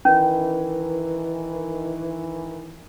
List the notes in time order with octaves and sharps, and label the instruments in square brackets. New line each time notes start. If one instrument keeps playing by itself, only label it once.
[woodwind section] D#3 E3 [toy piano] C#4